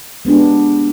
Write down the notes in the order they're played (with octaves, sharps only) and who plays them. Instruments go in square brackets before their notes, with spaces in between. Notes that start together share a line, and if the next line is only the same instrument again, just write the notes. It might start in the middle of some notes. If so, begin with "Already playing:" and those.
[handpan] G#3 B3 D4 G4